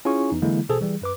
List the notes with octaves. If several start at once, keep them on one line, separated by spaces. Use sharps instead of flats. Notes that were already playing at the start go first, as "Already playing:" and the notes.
C#4 E4 F4 G#4 G#5 C#6
E2 D#4
D3 E3 F#3 G#3 A#3 E4
A1 B2 G#4 A4 C5
E3 G3 G#4
F#2 B4 D6